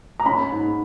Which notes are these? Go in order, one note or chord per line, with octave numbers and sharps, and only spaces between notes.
A#5
C#4 B5
G#2